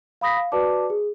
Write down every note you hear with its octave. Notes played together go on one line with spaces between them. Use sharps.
F5 B5 D#6 A#6 B6
F5
F#4 B4 D5 A5 D6
G#4